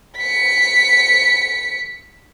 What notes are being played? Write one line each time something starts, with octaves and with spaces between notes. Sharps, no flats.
B6 C#7